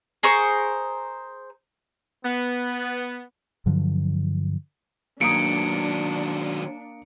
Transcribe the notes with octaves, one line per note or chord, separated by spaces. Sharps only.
G#4 A#4 C5 C#6
B3
G2 D3 F3 F#3
D#3 F#3 A#3 D4 A#5 D#6 C#7 D7